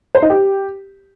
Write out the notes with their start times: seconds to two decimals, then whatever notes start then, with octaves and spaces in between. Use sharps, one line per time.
0.15 C5
0.22 D#4
0.30 G4